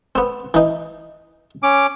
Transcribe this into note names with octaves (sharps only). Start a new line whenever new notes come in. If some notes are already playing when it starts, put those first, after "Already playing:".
B3 C4
E3 D#4
C#4 D6